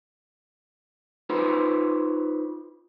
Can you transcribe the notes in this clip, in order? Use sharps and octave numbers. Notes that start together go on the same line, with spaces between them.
D#4 F4 B4 C5